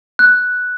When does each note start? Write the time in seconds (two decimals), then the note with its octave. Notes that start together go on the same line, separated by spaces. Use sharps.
0.19 F#6